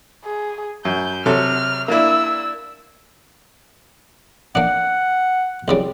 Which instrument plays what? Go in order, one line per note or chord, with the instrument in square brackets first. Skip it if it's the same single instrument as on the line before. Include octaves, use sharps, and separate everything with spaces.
[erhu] G#4
[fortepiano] F#2 [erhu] G6
[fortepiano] C3 F#3 A4 [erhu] F6
[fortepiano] A#3 D4 E4 [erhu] E6
[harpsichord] A#3 D4 [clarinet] F#5
[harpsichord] C2 C#3 G3